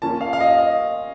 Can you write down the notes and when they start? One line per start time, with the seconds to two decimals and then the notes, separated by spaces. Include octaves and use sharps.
0.02 F3 A#3 C#4 F4 A#4 A5
0.21 F5
0.33 F5
0.40 D#5
0.58 D#5